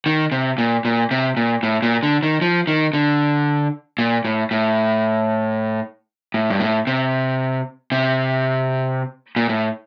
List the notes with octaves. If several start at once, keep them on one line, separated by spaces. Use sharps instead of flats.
D#3
C3
A#2
A#2
C3
A#2
A2
A#2
D3
D#3
F3
D#3
D3
A#2
A2
A2
A2
G2
A2
C3
C3
A#2
A2